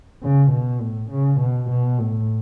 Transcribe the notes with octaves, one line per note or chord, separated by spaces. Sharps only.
C#3
B2
A2
C#3
B2
B2
A2